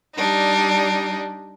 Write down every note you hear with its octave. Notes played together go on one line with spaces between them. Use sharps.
G3 D4 D#4